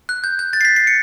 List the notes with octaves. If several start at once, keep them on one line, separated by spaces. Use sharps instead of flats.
F#6
G6
G6
A6
C7
B6
C7
C#7